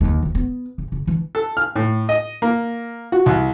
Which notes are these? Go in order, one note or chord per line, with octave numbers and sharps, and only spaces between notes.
D#2 D3
D2 C#3
B3
C#3
C#3
E3 D4
A4
F6
A2
D#5
A#3
F#4
C2